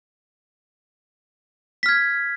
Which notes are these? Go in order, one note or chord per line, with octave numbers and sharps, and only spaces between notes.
F6 G#6 B6